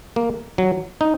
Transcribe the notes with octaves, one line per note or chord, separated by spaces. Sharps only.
A#3
F#3
D#4